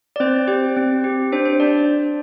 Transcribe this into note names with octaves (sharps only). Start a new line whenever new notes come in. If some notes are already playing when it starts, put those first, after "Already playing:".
D5
C4 C5
G4 C5
C4
G4
D4 C5
C5
D4 D5